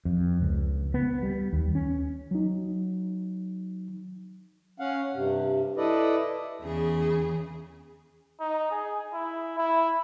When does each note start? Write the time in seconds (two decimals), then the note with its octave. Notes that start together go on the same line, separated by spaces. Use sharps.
0.05 F2
0.42 C#2
0.94 B3
1.23 G3
1.53 D#2
1.75 C#4
2.31 F#3 D#4
4.80 C#4 F5 F#5
5.14 G2 C3
5.77 E4 A4 B4 D5 D#5
6.62 E2 C#3 G#4
8.40 D#4
8.71 G#4
9.14 E4
9.58 E4